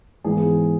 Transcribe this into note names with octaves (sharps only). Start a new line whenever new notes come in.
G#2 E3 B3 G#4